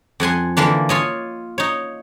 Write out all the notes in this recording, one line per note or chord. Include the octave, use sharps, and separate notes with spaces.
F2 F#5 G#5 C6
D3 E3 A#3 D4
F4 C#5 D#5
D#4 C#5